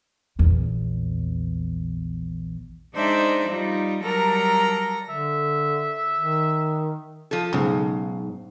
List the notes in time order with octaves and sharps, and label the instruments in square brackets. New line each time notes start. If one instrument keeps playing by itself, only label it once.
[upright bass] A#1 E2
[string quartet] G#3 D4 D#4 C5 D5 E5
G3 D#4 F4
F#3 G3 A4 A#4 A#5 A#6
[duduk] D3 [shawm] E5
[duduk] D#3
[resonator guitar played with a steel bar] F3 A4
[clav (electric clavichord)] B1 G#2 [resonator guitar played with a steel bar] C#3